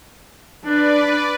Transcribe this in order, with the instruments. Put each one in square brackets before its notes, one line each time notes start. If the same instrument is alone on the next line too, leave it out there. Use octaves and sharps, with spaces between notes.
[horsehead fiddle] D4 [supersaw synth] B4 D5